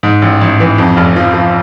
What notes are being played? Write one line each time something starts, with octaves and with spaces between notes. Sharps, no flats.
G#2
A1
A1
E3
F2
F1
F3
F3